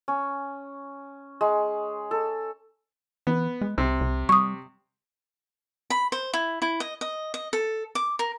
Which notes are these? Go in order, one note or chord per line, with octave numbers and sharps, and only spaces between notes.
C#4
G#3
A4
E3 B3
G#3
C2 C3
C2
G3 C#6 D#6
B5
C5
E4
E4
D#5
D#5
D#5
A4
D6
A#4